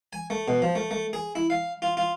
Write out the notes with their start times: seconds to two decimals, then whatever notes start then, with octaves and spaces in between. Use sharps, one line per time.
0.13 G#5
0.30 A3
0.48 B2
0.62 F3
0.75 A3
0.91 A3
1.13 G#4
1.35 E4
1.50 F5
1.82 F4
1.97 F4